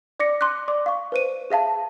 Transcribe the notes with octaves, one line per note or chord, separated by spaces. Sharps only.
D5 D6 A#6 C#7
C6 D6 F#6
D5 D6
F5 C#6
B4 C5 D#7
G#4 E5 F5 A5